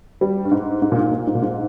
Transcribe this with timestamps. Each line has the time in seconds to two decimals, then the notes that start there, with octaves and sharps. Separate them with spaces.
0.21 G3
0.45 G2
0.51 G#2
0.82 G#2
0.92 A#2
0.97 G#2
1.11 A#2
1.27 G#2
1.35 A#2
1.42 G#2